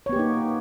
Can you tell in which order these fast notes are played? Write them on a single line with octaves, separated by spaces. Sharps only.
C#5 B3 G4 A#3 D#4